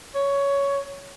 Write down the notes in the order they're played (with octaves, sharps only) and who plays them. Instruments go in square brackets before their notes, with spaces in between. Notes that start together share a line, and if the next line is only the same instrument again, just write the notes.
[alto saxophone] C#5